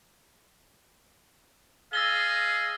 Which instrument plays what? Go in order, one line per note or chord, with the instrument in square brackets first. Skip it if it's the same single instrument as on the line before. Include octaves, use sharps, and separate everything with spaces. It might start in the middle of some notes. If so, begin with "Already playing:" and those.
[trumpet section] G#4 D#5 F5 [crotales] E6 A6 G7